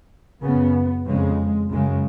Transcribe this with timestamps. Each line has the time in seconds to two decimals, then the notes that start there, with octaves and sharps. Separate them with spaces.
0.42 F#2 C#3 B3
1.06 F2 C#3 G#3
1.70 F#2 C#3 G#3